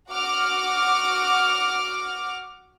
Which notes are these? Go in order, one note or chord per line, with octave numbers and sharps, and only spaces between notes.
F#4 F#5 D6 F6